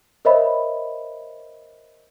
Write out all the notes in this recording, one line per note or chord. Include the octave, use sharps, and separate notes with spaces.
A#4 C5 C#5 D#5 E5 B5